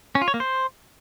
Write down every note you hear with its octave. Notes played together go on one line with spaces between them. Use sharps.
C#4
F4
C#5
A#3
C5